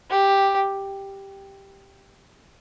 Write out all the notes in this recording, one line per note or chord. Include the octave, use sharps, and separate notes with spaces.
G4